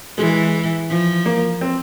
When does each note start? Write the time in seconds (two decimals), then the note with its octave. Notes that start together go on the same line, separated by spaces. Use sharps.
0.18 E3 G#3
0.90 F3
1.26 A#3
1.61 C4